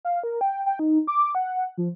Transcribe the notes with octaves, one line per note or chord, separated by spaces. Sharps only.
F5
A#4
G5
G5
D#4
D6
F#5
F3